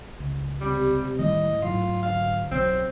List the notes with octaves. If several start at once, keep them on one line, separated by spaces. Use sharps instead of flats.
C#2
C3 G3
A2 D#3 G3 A3 D#5
G#2 F#3 F4
D2 F5
B1 F#3 C4